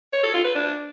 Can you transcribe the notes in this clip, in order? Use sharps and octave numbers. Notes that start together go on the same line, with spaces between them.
C#5
A4
F4
B4
D4